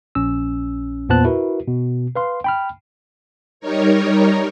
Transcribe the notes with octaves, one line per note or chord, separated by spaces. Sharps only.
A#1 C#4 E6
E2 A#2 B3 C5 A5 F#6
E4 F#4 A#4 B4
B2
B4 F5 C6
G5 B5 F6
G3 D#4 A#4 C#5